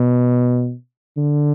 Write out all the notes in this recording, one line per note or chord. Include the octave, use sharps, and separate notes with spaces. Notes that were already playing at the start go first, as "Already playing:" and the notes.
Already playing: B2
D3